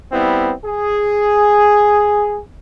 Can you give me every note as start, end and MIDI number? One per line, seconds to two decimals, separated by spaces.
0.12 0.53 55
0.12 0.53 59
0.12 0.53 60
0.12 0.53 64
0.65 2.39 68